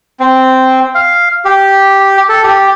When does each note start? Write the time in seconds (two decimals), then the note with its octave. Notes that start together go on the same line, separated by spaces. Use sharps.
0.20 C4
0.95 F5
1.45 G4
2.29 A4
2.44 G4